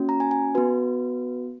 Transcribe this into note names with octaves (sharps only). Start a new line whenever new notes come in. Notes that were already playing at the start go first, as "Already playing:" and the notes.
Already playing: A#3 C#4 F#4
A#5
G#5
G#5
B3 F#4 B4